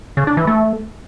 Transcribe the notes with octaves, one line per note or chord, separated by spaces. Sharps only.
C#3
D4
E3
A3